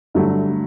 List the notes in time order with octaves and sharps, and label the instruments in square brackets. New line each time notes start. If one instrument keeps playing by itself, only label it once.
[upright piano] G2 D3 F#3 A3